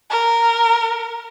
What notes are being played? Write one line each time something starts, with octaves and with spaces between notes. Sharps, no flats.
A#4